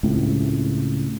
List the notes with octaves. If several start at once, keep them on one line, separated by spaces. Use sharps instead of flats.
C#2 A2 C3